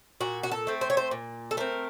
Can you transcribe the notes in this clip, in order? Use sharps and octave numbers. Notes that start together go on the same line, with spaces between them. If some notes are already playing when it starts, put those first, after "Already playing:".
A#2 F#4
F#4
A4
A3 C4
C5
C#5
C5
A#2
A4
A3 C4 A#4